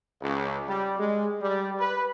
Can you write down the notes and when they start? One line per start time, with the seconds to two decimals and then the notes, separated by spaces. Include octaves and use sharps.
0.22 C#2
0.68 G3
0.99 G#3
1.41 G3
1.78 B4